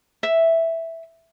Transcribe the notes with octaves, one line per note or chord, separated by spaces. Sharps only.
E5